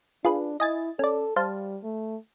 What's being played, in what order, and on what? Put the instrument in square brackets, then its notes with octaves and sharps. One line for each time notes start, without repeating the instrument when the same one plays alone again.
[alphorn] D4 [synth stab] F4 G#4 B4
[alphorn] E4 [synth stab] D#5 G#5 A6
[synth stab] C#4 D5 [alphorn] A4
[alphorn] G3 [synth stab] C5 F5 A5
[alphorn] A3